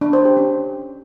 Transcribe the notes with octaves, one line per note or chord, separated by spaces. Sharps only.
D4
C5
G4
C#4